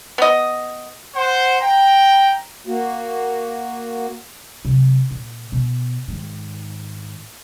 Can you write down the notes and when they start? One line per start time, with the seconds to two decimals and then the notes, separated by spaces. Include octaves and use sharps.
0.18 B3 D#5
1.15 C5 F#5
1.61 G5 A#5
2.67 A#3 F#4
4.65 C3 F#3
5.11 A#2
5.52 B2
6.08 G#2 D#3